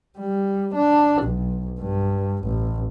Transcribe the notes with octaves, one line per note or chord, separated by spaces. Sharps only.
G3
D4
B1
G2
A1